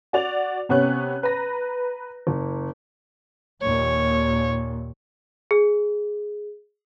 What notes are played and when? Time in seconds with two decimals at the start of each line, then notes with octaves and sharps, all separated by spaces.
0.13 F#4 D5 F7
0.69 C3 B3 C#4 C#5 F#6
1.23 B4 A#5 A#6
2.27 F#1
3.61 D#2 A#2 C#5
5.51 G#4